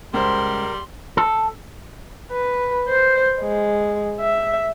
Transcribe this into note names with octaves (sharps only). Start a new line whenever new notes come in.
C#2 G3 A#4 C5 C6
A4
B4
C5
G#3
E5